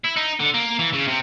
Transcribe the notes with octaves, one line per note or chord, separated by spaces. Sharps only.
E4
D#4
D3
A#3
E3
C#3
C3